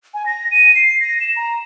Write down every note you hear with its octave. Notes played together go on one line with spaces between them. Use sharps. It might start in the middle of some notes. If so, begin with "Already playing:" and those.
G#5
A#6
D#7
C7
A#6
E7
A#5